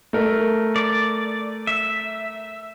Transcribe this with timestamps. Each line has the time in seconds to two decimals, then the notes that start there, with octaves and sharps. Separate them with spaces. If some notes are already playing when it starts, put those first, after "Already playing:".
0.13 A3 A#4
0.76 D5
1.67 E5